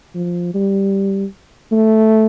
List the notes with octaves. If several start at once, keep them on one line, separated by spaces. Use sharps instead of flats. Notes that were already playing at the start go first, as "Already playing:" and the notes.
F3
G3
A3